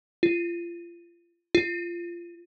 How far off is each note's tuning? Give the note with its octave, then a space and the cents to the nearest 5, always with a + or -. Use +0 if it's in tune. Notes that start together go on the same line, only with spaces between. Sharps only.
F4 -30
F4 -20